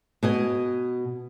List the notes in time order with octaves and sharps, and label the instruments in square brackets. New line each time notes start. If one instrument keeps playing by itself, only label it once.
[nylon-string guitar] B2 D#5 G#5